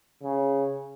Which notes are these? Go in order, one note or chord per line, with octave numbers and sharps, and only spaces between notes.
C#3